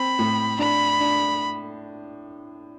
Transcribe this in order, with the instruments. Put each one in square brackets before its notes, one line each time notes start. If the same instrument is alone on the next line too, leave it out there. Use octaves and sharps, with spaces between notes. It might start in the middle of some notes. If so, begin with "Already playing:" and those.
Already playing: [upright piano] C4 [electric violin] B5
[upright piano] A2
[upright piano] D4 [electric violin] B5
[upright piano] D4